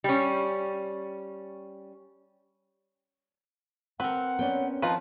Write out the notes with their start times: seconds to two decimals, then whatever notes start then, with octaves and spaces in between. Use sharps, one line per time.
0.04 G3 C#4
4.00 C4 A#4 B4 F#5 G5
4.39 B3 C#4 D5 G5
4.82 F3 D#4 F4 B4